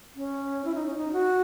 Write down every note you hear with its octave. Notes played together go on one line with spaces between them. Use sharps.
C#4
E4
D#4
C#4
D#4
F#4